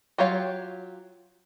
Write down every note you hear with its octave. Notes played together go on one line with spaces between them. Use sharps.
F#3 F4 G4 C#5 F5